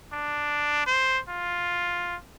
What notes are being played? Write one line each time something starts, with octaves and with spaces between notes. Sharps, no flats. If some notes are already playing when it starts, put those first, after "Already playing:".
D4
C5
F4